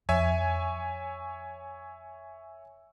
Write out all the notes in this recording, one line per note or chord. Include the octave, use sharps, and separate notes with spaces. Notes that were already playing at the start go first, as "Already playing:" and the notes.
F2 C#5 E5 G#5